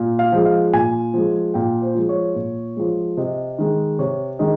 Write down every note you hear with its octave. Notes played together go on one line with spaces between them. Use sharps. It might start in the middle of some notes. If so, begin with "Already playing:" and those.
Already playing: A#2
F5
F3 G#3
F5
A#2 G#5
F3 G#3
A#2 G5
C5
F3 G#3
C#5
A#2
F3 G#3
C3 D#5
D#3 G#3
C3 C#5
D#3 G#3 D#5